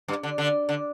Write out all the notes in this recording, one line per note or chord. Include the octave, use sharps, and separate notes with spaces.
G2
D3
D3
D3